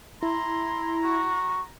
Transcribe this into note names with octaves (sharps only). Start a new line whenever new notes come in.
E4 A#5 C6
F#4 C#6